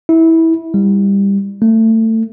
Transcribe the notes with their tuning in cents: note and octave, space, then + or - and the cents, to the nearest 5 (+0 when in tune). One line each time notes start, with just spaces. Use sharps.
E4 -20
G3 +20
A3 +25